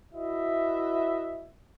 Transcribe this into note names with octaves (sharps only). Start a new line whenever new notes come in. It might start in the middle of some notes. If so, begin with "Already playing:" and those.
E4 F#4 B4 D#5 E5